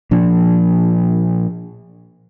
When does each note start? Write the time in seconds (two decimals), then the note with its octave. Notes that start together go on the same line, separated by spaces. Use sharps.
0.11 A#2 F3 D4